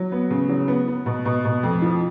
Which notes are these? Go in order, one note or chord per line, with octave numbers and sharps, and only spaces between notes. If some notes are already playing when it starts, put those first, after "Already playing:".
Already playing: F#3
B3
C#3
F#3
B3
B3
B2
B2
B2
F2
F3